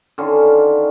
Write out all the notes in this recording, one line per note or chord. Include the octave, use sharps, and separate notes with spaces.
D3 D#3 C#4 F4